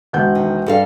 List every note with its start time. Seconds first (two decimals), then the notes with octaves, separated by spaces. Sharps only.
0.13 E1 F#5 G6
0.35 D#3
0.66 G2 A4 F5